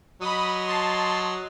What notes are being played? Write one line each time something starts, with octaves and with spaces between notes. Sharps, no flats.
F#3 D#5 B5 D#6
A5 C6